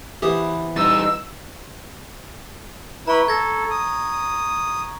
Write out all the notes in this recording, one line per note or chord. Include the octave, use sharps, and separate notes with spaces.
E3 B3 G4 C5 D#6
G3 D#4 E6 A6
E4 B4 A#5 C#6
A4 G#6 A#6
D#6